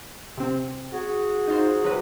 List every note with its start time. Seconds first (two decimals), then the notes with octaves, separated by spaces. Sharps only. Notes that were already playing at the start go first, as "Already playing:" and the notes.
0.37 C3 C4
0.92 F#4 G#4
1.48 D#4 F4 C5
1.84 C3 F#3 F#4 B4